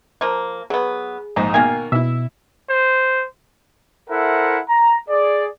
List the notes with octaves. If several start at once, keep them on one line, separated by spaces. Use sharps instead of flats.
F3 A#3
F#3 B3 G#4
A#1 G#2 D#4 C5
B2 D#3 A#3 G#5
B2 E4 E5
C5
E4 A4 A#4 C5 E5 F#5
A#5
G#4 D5